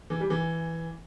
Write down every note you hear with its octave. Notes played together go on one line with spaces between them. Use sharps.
E3
G3
E3